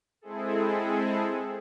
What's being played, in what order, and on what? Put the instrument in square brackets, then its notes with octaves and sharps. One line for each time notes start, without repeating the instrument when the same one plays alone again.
[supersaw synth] G#3 C4 E4 G#4 A4